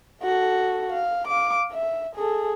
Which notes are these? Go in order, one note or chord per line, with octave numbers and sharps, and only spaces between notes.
F#4 A4
F5
F5 D6
E5
G#4 A4